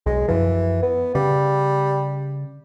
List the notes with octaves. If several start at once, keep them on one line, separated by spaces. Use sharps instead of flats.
B1 G#3
F#2 E3 F3
B3
C#3 G3